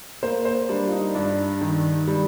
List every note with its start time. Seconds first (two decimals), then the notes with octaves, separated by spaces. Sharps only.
0.23 A#3 C5
0.45 C5
0.69 G3 D4
0.87 F4
0.92 D#4
1.15 G2 D4
1.61 D#3
2.07 G3